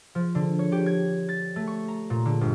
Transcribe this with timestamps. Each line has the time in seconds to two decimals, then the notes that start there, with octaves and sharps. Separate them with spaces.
0.15 F3
0.35 D3
0.59 C#5
0.72 G4
0.86 G#6
1.29 A6
1.56 A3
1.67 C#6
1.88 A#5
2.10 A#2
2.25 D3
2.41 G1